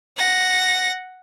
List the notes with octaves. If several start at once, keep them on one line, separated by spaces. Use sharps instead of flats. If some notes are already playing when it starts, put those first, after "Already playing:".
F#5 A#6